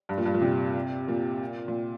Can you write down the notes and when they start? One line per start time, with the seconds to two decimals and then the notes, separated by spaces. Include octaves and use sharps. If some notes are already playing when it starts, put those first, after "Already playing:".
0.09 G2
0.18 A#2
0.25 G2
0.34 A#2
0.42 C3
1.08 A#2
1.68 A#2